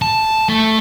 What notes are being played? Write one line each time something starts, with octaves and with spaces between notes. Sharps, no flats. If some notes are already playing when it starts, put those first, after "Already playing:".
A5
A3 A5